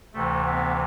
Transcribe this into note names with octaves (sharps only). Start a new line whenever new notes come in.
D2 C3 E3 A3
B3